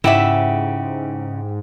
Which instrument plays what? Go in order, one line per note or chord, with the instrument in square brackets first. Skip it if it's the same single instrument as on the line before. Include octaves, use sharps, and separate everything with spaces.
[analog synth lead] G#2 [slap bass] C#3 [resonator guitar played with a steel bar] E4 E5 [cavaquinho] G4 F#5 D6